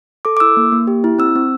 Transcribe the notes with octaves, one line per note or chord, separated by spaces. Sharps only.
A4 D6
D6
E4 E6
A#3
A#3
G4
E4
C4 E6
C4